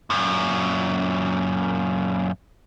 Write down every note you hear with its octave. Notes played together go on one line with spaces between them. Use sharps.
F#2 A#2